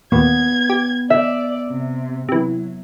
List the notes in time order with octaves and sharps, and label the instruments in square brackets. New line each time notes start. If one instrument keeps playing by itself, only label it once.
[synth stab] D#2 A#2 [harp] B3 [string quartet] G#6
[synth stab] G4
[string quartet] D5 [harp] E5
[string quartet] C3
[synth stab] C3 E3 [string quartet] F#3